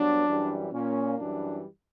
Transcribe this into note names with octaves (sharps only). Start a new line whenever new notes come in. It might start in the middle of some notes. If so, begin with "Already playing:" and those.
Already playing: G2 F#3 B3 D4
F#2 E3 G3
A#2 A#3 C#4
F#2 E3 G3 D4